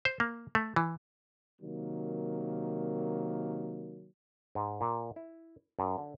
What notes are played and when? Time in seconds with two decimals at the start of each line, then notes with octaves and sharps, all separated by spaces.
0.05 C5
0.20 A#3
0.55 A3
0.76 E3
1.62 C3 D#3 F#3 A#3
4.55 G#2
4.81 A#2
5.16 E4
5.79 F#2
5.98 D3